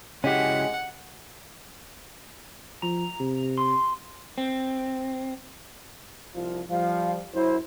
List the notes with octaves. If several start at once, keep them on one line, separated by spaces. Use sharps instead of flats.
C#3 G#3 C#4 E4 F#4 G4 F#5
F3 A#5
C3
C6
C4
C2 F3 F4
F3 G3 F5
F#2 E4 C5